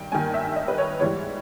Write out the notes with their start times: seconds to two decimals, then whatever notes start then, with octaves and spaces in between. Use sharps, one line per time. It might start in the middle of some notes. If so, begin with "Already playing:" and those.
Already playing: G2 D#3 G5
0.12 G2 D#3 A#3 G#5
0.34 E5
0.56 D#5
0.68 B4
0.78 C#5
1.00 G#2 E3 G3 C#5